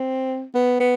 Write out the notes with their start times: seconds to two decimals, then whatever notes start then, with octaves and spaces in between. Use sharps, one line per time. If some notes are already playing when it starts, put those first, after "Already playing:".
Already playing: C4
0.54 B3
0.80 B3